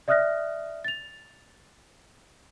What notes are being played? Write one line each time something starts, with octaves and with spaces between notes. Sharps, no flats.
D5 E5 D#6 F6 F#6 A#6
A6 F7